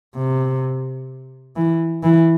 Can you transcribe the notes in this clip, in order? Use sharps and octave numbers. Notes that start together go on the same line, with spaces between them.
C3
E3
E3